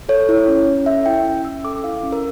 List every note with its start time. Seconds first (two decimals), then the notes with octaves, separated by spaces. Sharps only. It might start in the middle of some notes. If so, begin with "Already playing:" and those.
0.09 A4 C#5
0.29 E4
0.48 C#4
0.67 C#4
0.86 A4 E5
1.06 E4 G5
1.25 C#4
1.45 C#4 E6
1.65 A4 D6
1.84 E4 F5
2.03 C#4
2.12 A#4